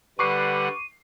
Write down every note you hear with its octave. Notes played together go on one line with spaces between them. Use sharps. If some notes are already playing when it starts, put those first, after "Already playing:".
D3 G3 B4 F#5 C#6 D6 C7 D#7